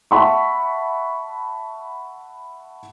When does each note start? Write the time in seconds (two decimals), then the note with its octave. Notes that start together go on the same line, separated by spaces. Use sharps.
0.11 E5 F#5 A5 B5 C#6